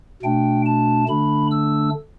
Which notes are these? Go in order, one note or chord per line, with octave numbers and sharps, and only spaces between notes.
B2 A3 D4 G5
A5
D3 A3 D4 B5
E6